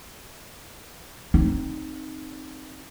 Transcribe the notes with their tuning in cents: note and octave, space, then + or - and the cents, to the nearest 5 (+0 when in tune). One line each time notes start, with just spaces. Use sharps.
C4 +15 D#4 +0